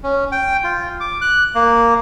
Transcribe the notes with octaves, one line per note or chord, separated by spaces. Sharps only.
C#4
G5
F4
D6
F#6
A#3